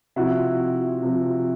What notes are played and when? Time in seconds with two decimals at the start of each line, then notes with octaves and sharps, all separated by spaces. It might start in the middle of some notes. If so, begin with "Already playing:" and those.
0.16 C3 F3 E4 F#4
1.01 C3 F3